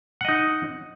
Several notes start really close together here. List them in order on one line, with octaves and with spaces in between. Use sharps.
F#5 D#5 D#4